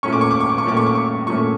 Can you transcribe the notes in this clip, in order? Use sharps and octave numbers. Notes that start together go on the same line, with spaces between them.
A#2 A3 C#4 C#6
D6
C#6
D6
C#6
D6
C#6
A#2 A3 C#4 D6
C#6
D6
C#6
A#2 A3 C#4 C#6